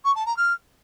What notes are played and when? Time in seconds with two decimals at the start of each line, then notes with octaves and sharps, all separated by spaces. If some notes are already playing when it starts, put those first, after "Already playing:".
0.04 C#6
0.15 A5
0.25 A#5
0.36 F6